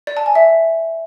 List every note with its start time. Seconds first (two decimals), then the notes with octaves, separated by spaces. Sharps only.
0.07 D5
0.17 A5
0.26 G#5
0.35 E5